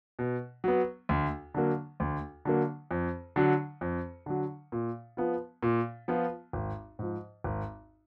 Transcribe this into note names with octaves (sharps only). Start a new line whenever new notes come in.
B2
F#3 B3
D2
D3 F#3 A#3
D2
D3 F#3 A#3
F2
D3 F#3
F2
D3 F#3
A#2
F3 B3 F4
A#2
F3 B3 F4
G#1
G#2 F3
G#1